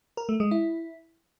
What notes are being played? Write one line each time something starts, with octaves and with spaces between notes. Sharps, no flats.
A#4
A3
G#3
E4